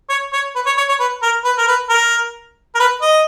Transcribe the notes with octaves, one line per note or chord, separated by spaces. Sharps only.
C#5
C#5
B4
C#5
C#5
C#5
B4
A#4
B4
A#4
B4
A#4
A#4
B4
D#5